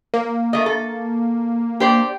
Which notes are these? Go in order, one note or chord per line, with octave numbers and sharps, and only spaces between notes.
A#3
A3 D#5
A4
G4 C5 D5